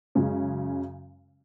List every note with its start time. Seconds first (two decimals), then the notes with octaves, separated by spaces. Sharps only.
0.15 F#2 C#3 G#3 C#4